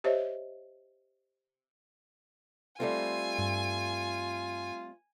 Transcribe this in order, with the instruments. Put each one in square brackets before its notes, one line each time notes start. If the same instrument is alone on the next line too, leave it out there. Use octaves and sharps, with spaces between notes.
[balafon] G4 C5 C#5 D#5 E5
[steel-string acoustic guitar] G3 A3 C4 [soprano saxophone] F4 [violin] G#5
[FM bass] G2